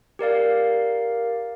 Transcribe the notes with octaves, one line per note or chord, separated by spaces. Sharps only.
G4 A#4 D5 F5